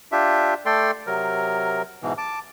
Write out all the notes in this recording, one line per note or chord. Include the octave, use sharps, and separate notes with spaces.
D4 F4 G4 E5
A3 A4 D5 G5 C6
C3 F#3 A#4
G#2 B2 E3
A5 D6